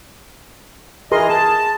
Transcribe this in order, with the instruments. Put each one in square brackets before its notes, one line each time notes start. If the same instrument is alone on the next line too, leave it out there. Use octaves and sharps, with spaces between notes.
[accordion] E3 D#5 [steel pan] G#4 A#4 C6
[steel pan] G#4 [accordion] A5